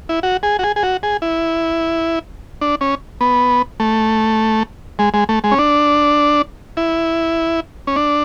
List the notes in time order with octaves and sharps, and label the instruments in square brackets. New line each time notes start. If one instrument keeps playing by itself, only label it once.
[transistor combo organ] E4
F#4
G#4
F#4
G#4
G#4
F#4
G#4
E4
D4
C#4
B3
A3
G#3
G#3
A3
G#3
C#4
D4
E4
C#4
D4